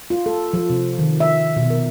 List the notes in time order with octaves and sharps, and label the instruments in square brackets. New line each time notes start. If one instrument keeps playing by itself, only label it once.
[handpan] F4
A4
F3
C3
D#3
E5
B2
A#4